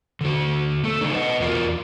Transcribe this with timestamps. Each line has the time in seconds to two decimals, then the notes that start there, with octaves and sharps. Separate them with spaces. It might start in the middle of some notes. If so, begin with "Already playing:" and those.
0.21 D3 F#4
0.84 A3 A4
1.01 C#3 G#3 D4 D#4
1.14 B4 D#5 F#5
1.40 E2 F4 F#4 A#4 D5